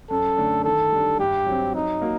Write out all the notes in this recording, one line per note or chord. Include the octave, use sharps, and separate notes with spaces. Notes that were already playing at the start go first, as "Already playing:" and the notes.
F#2 A4
D3 A3 D4
D#3 A4
G3 D4
G2 G4
F#3 C4
F#3 D#4
A#3 F#4